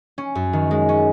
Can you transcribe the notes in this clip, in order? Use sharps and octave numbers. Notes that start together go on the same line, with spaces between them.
C#4
F#2
D#3
G#3
C#4